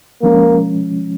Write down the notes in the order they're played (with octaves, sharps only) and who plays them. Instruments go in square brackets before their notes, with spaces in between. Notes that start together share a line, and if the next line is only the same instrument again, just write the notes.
[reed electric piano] F3 G#3 C#4 [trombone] A#3